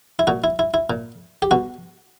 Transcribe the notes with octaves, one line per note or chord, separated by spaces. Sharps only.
E4
A#2 F#4
E4
E4
E4
A#2
G4
B2 F#4